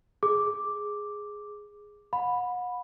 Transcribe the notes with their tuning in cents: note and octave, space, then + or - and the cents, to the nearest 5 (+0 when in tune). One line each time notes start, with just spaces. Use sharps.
G#4 +0 D6 +0
F#5 -35 B5 +0